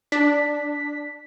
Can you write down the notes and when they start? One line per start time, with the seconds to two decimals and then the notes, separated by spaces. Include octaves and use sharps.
0.12 D4 B6